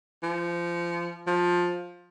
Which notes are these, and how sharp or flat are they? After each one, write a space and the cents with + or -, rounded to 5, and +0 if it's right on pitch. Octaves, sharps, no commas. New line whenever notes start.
F3 -25
F3 +15